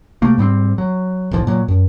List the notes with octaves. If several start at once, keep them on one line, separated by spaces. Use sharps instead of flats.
C3 A3 A#3
G#2 G3 B3 C4
F#3
D1 B1 E2 F3
A#2 F#3
F#2